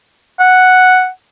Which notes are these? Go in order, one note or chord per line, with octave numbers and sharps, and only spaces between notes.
F#5